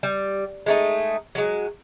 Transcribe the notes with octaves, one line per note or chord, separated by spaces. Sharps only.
G3
G#3 A3 D#4
F#3 G#3